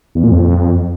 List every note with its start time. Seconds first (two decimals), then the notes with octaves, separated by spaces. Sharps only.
0.15 E2
0.23 A#2
0.31 F2